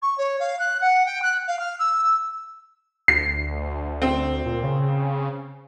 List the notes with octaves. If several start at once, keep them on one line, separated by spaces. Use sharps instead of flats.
C#6
C#5
F5
F#6
F#5
G5
F#6
F5
F6
E6
D2 C7
C4
A#2
C#3